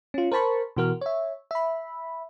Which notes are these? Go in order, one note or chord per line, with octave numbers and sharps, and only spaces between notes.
C#4 F4
A#4 C5 A5 B5 C#6
B2 E3 F#4 A#4 F6
C#5 E5
E5 B5